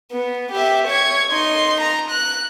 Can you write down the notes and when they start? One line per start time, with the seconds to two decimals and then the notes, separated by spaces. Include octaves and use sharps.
0.12 B3
0.52 G4 E5
0.87 C#5 G#6
1.30 D#4 C6
1.81 A#5
2.11 F#6